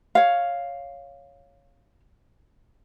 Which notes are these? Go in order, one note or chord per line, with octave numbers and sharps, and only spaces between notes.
C#5 F5